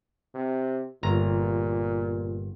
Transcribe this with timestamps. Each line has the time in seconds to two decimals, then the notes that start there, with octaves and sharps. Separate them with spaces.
0.34 C3
1.03 G1 A#2 A#5